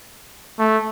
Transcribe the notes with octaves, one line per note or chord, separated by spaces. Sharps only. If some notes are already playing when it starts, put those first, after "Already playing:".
A3